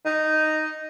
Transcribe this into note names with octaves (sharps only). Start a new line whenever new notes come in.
D#4